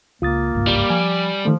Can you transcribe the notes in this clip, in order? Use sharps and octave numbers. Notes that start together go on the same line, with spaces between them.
C#2 A#3 F4 D#6 A6
G1 C#2 G#2
G3
F3 G#5
D#3 F3 A3